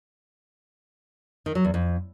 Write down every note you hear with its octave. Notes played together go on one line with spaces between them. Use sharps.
D#3
F#3
E2
F2